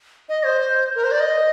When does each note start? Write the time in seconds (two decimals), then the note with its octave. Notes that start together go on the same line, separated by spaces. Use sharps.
0.29 D#5
0.45 C5
0.95 A#4
1.04 C5
1.11 D5
1.20 D#5